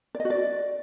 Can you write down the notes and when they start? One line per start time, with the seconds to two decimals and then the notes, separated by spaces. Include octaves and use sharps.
0.15 D5
0.20 D#5
0.25 F#4
0.30 D5